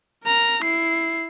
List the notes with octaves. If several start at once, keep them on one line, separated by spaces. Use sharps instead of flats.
A#4 A#5
E4 C7